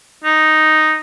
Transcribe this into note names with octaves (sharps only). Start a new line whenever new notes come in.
D#4